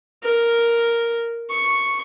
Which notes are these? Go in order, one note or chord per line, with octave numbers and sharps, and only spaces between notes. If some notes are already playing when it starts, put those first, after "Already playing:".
A#4
C#6